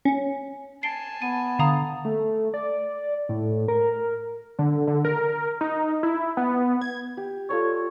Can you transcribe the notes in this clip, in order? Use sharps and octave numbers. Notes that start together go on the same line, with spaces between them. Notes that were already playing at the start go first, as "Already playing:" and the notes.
C#4
G#5 A5 C7 D7 G7
B3 D#7
D3 F5 A#5 D#6
A3
D5
A2
A#4
D3
D3
A#4
D#4
E4
B3
G#6
G4
F4 A4 C#5 D5